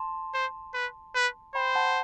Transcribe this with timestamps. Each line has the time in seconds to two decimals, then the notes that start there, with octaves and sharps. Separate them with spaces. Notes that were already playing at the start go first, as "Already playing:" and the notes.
Already playing: A5 C6
0.34 C5
0.74 B4
1.15 B4
1.55 C5 G5 B5
1.75 F#5 A5